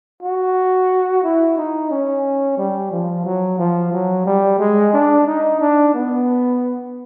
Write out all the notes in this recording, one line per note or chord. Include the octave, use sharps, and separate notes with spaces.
F#4
E4
D#4
C#4
G3
F3
F#3
F3
F#3
G3
G#3
D4
D#4
D4
B3